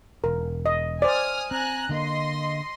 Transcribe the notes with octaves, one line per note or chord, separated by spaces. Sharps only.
E1 A#4
D#5
C5 D5 G#5 D#6 F6
C4 G#5 A#5 F#6
D3 A#3 D#5 C6